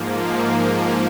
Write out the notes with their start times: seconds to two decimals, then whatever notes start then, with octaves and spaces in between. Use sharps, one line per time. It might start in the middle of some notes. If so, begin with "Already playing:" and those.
Already playing: G#2 F3 A#3
0.18 F5